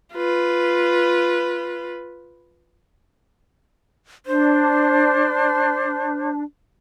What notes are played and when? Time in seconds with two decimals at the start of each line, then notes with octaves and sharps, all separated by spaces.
0.14 F4 B4
4.26 D4 C5